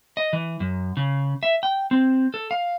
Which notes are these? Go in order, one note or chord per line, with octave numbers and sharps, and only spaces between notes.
D#5
E3
F#2
C#3
E5
G5
C4
A4
F5